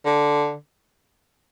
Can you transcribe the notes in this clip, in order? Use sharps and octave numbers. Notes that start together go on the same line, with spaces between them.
D3